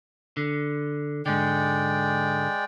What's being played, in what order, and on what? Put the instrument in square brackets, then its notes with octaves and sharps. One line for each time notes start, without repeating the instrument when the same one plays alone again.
[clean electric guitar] D3
[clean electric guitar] G#2 D3 [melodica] G#3 D5 G5